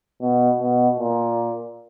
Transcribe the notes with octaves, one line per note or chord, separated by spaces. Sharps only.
B2
B2
A#2